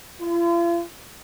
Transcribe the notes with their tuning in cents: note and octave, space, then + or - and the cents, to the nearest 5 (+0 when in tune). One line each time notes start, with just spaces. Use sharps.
F4 -40